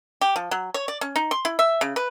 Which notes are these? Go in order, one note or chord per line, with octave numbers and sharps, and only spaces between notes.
G4
F3
F#3
C#5
D5
C#4
D#4
C6
E4
E5
C#3
B4